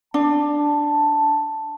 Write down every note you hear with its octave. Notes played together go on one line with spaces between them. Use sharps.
D4 A5